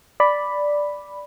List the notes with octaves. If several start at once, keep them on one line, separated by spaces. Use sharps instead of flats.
D5 B5